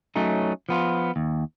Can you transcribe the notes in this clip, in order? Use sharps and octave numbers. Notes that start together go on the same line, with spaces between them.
F#3 A3 C#4 D#4
F3 B3 F4
D#2